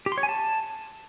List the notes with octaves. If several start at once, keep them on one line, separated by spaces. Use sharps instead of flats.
G4
C6
C#5
G#5
A5